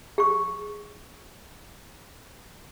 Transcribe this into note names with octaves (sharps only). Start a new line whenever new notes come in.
G#4 C#6